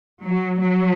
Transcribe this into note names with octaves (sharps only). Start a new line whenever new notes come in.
F#3
F#3